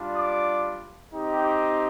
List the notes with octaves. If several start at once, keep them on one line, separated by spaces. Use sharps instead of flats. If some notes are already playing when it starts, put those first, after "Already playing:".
Already playing: G3 D4 F4
D6
C4 D#4 G4